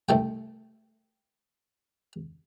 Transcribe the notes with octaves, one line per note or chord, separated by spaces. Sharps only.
C2 A3 G5